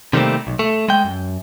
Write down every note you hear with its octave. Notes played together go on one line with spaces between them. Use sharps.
C3 D#3 G3 A3 A#3 C4
B1
A3
G#3 G5
F#2